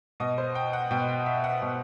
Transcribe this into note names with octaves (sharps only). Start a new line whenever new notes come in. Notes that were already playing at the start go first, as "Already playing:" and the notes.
B2 D#5
C5
G5
F#5
B2 G5
G5
E5
F#5
B2